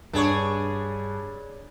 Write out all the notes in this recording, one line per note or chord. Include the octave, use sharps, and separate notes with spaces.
G2 D4 G#4 C#5 C#6